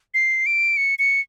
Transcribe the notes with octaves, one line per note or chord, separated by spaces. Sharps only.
C7
D7
C#7
C#7